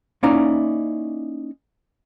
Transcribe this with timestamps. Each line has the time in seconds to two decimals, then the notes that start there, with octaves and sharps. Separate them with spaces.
0.23 A#3 C#4 D#4 E4 D5 A#5